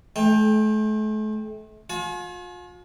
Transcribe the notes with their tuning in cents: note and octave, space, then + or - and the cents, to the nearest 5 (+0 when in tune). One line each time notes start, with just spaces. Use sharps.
A3 -40 G5 +20
F4 +40 G#5 +45